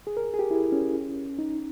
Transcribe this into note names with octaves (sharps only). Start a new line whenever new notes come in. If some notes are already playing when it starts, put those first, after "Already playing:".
G#4
A#4
G#4
G4
E4
C#4
D#4